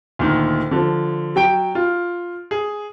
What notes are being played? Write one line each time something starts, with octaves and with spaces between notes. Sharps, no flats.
D2 A#2 D#3
D3 F3
F#3 G5 D7
F4
G#4